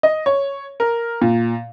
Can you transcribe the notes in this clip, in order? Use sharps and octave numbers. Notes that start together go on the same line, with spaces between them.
D#5
C#5
A#4
A#2